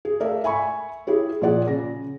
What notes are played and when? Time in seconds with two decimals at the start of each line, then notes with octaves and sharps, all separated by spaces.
0.05 G#4
0.20 A3 A#4 D5 E5 F5
0.44 E5 G#5 B5 C#6
1.07 E4 G4 G#4 C#5
1.42 A#2 F3 G#4 D5 F#5
1.68 C#3 A#6